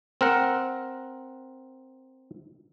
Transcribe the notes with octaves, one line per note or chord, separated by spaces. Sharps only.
C4 A#4 F#5